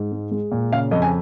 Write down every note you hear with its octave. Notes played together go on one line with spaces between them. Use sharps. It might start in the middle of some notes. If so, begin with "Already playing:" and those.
Already playing: G#2
G#3
G#3
A#2
C#3 F5
F2 D#5
G#5